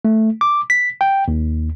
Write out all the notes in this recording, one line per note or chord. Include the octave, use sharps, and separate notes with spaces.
A3
D6
B6
G5
D#2